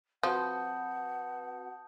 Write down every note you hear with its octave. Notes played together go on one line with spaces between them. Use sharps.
F3 C4 F#4 B4 F#5 A5 D#6 G6